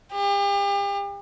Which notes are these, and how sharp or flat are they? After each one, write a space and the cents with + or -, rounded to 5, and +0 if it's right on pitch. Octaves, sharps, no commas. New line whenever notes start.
G4 +40